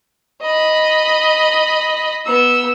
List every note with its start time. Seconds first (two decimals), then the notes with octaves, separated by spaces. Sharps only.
0.42 D#5 B5
2.26 B3 E6